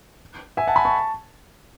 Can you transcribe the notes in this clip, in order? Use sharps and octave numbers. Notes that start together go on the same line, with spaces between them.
E5 G#5
F#5 A5
G#5 B5
A5 C#6